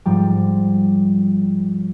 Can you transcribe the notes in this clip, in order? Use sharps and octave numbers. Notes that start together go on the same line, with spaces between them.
G#2 F3 G3